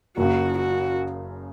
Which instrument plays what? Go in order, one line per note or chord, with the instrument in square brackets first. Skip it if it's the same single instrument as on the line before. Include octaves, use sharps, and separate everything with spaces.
[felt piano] F#1 F#2 C#3 [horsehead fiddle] F#4
[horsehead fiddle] F#4